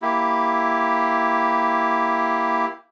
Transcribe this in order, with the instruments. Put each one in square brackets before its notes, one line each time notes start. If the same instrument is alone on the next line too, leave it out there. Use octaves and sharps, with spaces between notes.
[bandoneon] A#3 E4 G4